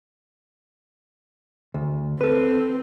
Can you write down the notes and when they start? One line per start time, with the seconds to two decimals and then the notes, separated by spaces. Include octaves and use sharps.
1.74 D2
2.21 C4 A4 B4